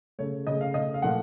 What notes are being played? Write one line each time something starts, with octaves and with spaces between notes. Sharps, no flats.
C#3 A3 C#5
C#3 A3 D#5
F5
C#3 A3 D#5
F5
A#2 F3 A3 F#5